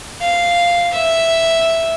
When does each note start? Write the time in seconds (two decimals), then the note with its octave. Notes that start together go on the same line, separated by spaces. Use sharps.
0.22 F5
0.93 E5